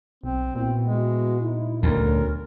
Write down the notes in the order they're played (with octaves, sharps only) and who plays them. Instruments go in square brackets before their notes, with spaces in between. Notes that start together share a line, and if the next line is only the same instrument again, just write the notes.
[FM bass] B1 [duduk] C4
[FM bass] A#2 [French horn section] B3 E4 F#4 [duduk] C4
[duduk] G#3
[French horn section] D#4 E4
[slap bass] D2 [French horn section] B2 F#3 C#4 [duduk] A#4